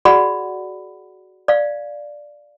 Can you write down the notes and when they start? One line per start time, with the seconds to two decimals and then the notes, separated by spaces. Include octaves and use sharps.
0.05 F#4 G#4 D5 F#5 B5
1.48 D5 F5